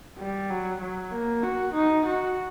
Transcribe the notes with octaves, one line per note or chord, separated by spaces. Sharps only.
G3
F#3
F#3
A#3
F#4
D#4
F#4